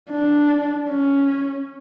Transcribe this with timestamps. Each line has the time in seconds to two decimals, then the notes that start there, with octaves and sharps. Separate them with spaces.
0.10 D4
0.90 C#4